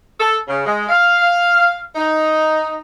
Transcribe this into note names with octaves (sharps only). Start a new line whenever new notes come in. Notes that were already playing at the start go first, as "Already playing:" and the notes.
A4
C#3
G#3
F5
D#4